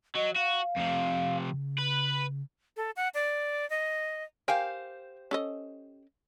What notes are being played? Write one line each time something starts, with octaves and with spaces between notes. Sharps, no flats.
F#3 D#5
F#4 F5
F2 C3
C#3
B4
A4
F#5
D5
D#5
G4 A#4 C5 F5 G5 G#5
C#4 A4 D#5